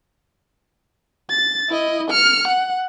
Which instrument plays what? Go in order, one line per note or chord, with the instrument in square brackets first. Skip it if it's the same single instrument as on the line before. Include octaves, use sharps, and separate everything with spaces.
[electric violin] A6
E4 D#5
F6 C#7
F#5